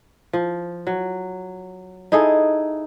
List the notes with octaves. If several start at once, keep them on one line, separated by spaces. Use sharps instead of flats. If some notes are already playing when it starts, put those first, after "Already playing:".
F3
F#3
D#4 E4 G#4 A4